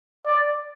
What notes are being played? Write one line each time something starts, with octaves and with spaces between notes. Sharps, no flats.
D5